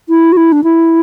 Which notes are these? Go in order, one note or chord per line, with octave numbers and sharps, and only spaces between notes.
E4
F#4
E4
D4
E4